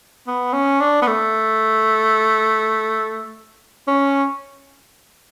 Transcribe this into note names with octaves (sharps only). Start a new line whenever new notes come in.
B3
C#4
D4
B3
A3
C#4